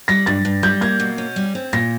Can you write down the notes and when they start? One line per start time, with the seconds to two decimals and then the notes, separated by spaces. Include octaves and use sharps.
0.08 G3 A#6
0.26 G2 A6
0.45 G2
0.63 G3 G6
0.81 A#3 G#6
1.00 B2
1.18 C#4
1.36 G3
1.55 C4
1.73 A#2 A#6